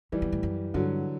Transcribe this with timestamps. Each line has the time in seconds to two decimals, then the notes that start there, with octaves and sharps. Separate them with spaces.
0.12 A2 E3 G3
0.22 B2
0.32 A2
0.43 F#2
0.74 G2 D3 F#3